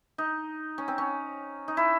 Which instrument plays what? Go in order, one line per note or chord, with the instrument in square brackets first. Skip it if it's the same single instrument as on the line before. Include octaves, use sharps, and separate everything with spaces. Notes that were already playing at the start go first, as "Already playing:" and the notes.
[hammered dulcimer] D#4
C#4
C4
C#4
D#4
E4